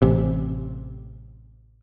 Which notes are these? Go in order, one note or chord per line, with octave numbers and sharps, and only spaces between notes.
A1 C3